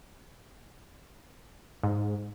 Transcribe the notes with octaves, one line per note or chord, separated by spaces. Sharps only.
G#2